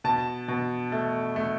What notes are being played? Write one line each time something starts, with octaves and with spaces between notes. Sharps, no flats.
B2 A5
B2
A3
A3